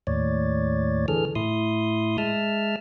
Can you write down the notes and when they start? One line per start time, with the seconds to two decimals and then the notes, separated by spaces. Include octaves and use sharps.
0.07 D#2 A2 C#5 D5
1.08 D3 E3 G#4 A4 F6
1.35 A2 E4 C6 D#6
2.18 G#3 E5 A5 F6